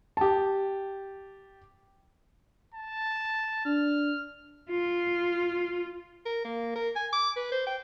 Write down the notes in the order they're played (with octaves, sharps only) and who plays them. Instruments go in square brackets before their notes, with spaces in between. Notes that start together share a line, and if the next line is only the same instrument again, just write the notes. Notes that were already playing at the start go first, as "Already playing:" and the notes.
[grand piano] G4 A5
[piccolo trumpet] A5
[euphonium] D4 [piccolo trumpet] F6
[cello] F4
[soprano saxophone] A#4
A#3
A#4
G#5
D6
B4
C5
G5